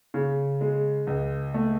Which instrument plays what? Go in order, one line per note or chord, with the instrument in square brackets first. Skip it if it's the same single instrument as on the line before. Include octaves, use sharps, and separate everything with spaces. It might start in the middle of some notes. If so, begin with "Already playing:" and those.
[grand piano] C#3
G#3
C#2
A3